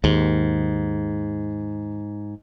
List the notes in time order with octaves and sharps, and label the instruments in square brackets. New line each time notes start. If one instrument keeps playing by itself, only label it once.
[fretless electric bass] D#2 [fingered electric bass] G#2